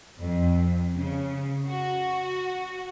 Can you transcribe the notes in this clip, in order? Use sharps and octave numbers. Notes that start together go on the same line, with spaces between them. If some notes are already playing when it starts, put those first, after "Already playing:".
F2
C#3
F#4